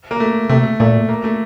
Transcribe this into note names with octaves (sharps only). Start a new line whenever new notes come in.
A#3
A3
C3 A3
A#2 A3
A#3
A3